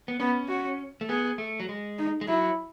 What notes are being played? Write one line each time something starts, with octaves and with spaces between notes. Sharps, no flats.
B3
B3 C#4
F#4
A3
B3 G#4
A3
F#3
G#3
D#4
G#3
F#3 E4